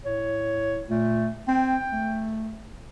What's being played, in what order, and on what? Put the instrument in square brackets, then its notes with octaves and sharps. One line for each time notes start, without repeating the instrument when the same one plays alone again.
[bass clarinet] A2 [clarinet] C#5
[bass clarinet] A#2 [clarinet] A3
[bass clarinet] C4 [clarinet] G5
[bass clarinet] A3